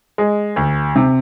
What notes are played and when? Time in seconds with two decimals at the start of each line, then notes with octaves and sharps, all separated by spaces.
0.18 G#3
0.56 D2
0.96 C3